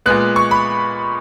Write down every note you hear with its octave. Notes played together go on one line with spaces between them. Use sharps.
A#2 G#3 B3 F#6
C#6
B5